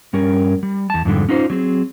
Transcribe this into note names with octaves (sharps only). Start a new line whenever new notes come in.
G2 G3 C#4 A#4
G3
E2 A5
F2 G#2 D3 G3
C#4 D#4 F4 B4 C5
F#3 C4 G#4